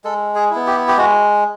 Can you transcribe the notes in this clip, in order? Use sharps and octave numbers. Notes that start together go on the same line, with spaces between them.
G#3 A4
G#4
B3 E4
G4
G4
G#3 F#4